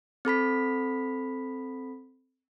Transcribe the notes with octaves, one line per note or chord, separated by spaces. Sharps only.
C4 A4 B5 B6